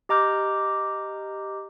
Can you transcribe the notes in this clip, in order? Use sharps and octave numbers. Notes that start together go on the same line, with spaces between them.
G4 D#5 A#5 D6 F6 G6